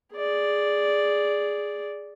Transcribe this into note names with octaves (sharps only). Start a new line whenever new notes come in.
G#4 D5